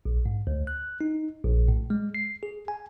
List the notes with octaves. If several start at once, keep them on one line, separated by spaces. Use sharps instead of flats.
A#1
G#2
D2
F#6
D#4
A#1
A2
G#3
C7
G#4
G#5